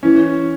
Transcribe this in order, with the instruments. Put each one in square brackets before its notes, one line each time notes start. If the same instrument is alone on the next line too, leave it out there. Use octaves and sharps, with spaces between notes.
[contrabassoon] E3 [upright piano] C#4